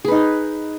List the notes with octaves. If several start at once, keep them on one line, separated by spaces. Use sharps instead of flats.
D#4 G#4 B4